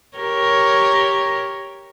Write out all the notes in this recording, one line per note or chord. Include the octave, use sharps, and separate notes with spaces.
G4 A#4 C#5